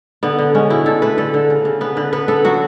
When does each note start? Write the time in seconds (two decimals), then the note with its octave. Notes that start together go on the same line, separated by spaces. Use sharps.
0.23 D3 B3
0.39 D3
0.55 G#3 C#4
0.70 B2 E4
0.86 D3 A4
1.02 A3 B4
1.18 D3 A4
1.34 D3
1.50 C#3
1.65 C#3
1.81 B3 B4
1.97 D3 B4
2.13 B3 B4
2.28 B3 A4
2.44 F#3 F#4